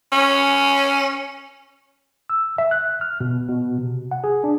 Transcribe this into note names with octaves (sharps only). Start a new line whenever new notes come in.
C#4
E6
E5
F#6
F6
B2
B2
C3
F#5
G#4
D4